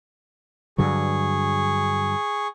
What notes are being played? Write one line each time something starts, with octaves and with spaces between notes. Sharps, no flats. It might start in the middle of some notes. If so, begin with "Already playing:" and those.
G2 D3 F#3 G#4 C#6